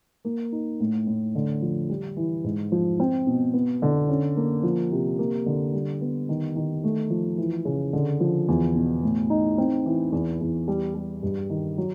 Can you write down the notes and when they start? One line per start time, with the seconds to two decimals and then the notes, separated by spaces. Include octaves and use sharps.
0.25 A#3
0.52 D#4
0.80 A2
1.07 A2
1.35 D3
1.62 F3
1.90 G3
2.16 E3
2.44 G#2
2.72 F3
3.00 C4
3.27 B2
3.54 B3
3.82 D3
4.09 C#4
4.37 A#3
4.63 F3
4.91 C3
5.19 A#3
5.46 D3
5.73 G3
6.01 B3
6.29 D#3
6.56 D#3
6.84 A3
7.10 F3
7.38 E3
7.65 C#3
7.93 D3
8.20 F3
8.48 E2
8.75 B2
9.03 A2
9.30 D#4
9.58 C4
9.86 E3
10.12 E2
10.41 E2
10.68 G3
10.94 G3
11.23 G2
11.50 D#3
11.78 F#3